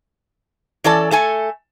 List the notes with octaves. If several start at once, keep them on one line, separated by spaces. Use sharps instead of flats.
E3 C#4 A4 D5 A5
A3 A4 G#5